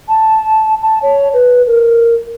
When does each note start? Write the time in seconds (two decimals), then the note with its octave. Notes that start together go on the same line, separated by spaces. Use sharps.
0.08 A5
0.82 A5
1.02 C#5
1.33 B4
1.66 A#4